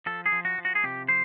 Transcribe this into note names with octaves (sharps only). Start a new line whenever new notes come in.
F3 A4
G#4
F3
F#4
F3
F#4
G#4
C3 G4
F3 C5